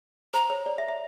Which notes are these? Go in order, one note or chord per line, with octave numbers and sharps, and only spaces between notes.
C5 A#5
C#5
D5
E5
E5